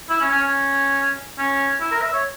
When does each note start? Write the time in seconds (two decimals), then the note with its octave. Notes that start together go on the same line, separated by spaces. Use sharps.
0.09 E4
0.21 C#4
0.31 C#4
0.42 C#4
1.38 C#4
1.81 E4
1.92 A#4
2.02 E5
2.13 C#5